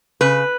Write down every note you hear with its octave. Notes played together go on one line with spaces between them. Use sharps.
C#3 B4